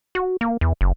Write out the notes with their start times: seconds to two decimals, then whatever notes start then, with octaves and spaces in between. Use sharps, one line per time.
0.15 F#4
0.41 A#3
0.61 E2
0.81 F#1